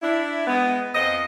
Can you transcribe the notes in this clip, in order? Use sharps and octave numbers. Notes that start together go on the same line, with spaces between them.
D4 E4
G#3 B3
F2 F3 D#5